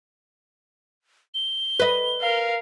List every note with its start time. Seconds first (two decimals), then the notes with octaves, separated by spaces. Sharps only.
1.34 G7
1.80 B4 D#5
2.21 A#4 F5